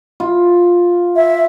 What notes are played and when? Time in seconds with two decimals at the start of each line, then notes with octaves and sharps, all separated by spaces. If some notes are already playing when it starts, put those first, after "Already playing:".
0.20 F4
1.16 E5